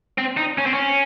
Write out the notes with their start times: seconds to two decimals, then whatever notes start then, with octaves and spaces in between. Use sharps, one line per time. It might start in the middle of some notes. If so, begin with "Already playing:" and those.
0.18 C4
0.37 D#4
0.59 C#4
0.66 C4
0.74 C#4